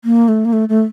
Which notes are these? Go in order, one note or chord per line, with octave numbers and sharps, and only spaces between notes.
A#3
A3
A#3
A3
A3